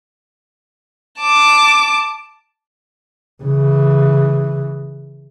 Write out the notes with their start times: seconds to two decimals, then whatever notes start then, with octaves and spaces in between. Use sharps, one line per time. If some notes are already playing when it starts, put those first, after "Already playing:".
1.20 A5 D6
3.43 C#3 E3